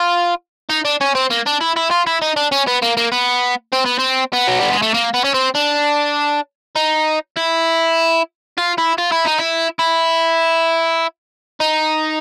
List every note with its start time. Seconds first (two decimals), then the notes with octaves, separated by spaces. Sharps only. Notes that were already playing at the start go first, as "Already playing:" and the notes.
Already playing: F4
0.70 D#4
0.85 D4
1.01 C#4
1.15 C4
1.30 A#3
1.46 D4
1.61 E4
1.76 E4
1.91 F4
2.07 E4
2.22 D#4
2.36 D4
2.52 C#4
2.67 B3
2.82 A#3
2.97 A#3
3.12 B3
3.73 C4
3.86 B3
3.99 C4
4.33 B3
4.48 F#3
4.59 G3
4.71 G#3
4.82 A3
4.94 A#3
5.14 B3
5.24 C#4
5.34 C4
5.55 D4
6.76 D#4
7.37 E4
8.58 F4
8.78 E4
8.98 F4
9.12 E4
9.25 D#4
9.39 E4
9.79 E4
11.60 D#4